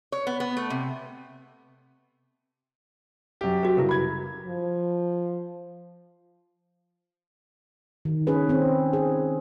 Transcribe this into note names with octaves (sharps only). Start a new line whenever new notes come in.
C#5
B3
B3
A3
C3
F#2 G4
F#4 B4
G2 C#3 E4 A#4 B4
B5 G#6
F3
D#3
C#4 G#4 B4
C4
G#4